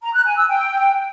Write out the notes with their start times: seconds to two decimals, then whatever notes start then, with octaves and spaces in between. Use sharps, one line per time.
0.02 A#5
0.14 F#6
0.25 G#5
0.37 E6
0.48 G5